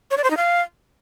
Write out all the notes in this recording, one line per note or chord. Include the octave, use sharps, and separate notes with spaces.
C#5
D5
C5
D#4
F5